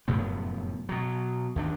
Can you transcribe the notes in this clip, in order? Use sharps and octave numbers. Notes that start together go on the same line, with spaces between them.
F1 F#2 A2 B3
B2 F#3
D#2 D#3 D4